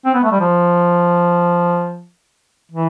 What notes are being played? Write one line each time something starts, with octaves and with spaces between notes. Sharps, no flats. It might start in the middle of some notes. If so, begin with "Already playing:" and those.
C4
B3
A3
G3
F3
E3